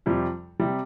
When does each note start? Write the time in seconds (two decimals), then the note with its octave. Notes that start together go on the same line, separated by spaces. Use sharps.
0.06 F2 C3 G3
0.60 C3 G3